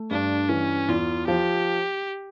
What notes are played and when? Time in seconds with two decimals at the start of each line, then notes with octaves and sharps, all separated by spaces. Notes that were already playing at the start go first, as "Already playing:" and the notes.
Already playing: A3
0.11 G2 D4
0.49 E3 C#4
0.88 E2 F4
1.27 F3 G4